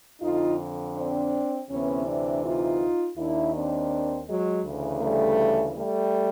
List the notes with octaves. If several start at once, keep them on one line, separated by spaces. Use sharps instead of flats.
F2 D3 D#4 F4
C4 D4
D2 C3 E3 B3 C#4
C4 D4
D#4 F4
D#2 D#3 D4 E4
C4 D4
F#3 G#3
D2 C#3 E3
G3 A3
G3 A3